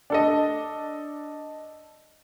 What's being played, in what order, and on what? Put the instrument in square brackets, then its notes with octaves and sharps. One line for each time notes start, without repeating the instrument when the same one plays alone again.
[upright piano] D4 A4 D#5